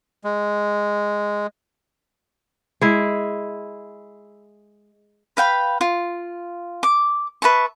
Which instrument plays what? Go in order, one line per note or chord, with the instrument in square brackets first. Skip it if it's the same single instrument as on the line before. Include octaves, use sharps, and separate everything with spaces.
[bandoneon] G#3
[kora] G#3 E4
[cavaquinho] B4 F5 G5 B5
F4
D6
B4 E5 A5 C#6